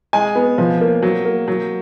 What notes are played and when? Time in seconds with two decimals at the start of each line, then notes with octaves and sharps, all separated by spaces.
0.13 G#3 G#5
0.36 B3
0.58 F3
0.81 A#3
1.02 F#3
1.25 A#3
1.48 F#3